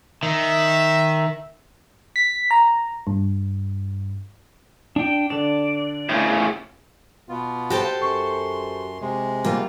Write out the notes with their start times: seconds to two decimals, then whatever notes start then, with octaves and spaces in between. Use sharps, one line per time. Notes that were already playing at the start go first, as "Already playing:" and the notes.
0.23 D#3 E5
2.16 B6
2.51 A#5
3.07 G2
4.96 D4 G5
5.30 D3 D4 D5 E7
6.09 A2 C#3
7.29 B2 B3 F4
7.70 F#4 G4 A4 C5
8.02 F#2 C6 C#6
9.01 C3 G#3
9.44 E2 G3 A#3 F4